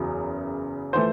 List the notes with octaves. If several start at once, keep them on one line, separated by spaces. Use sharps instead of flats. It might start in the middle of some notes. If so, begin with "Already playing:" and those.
Already playing: F#1 E2 C#3 F#3
E3 A3 C5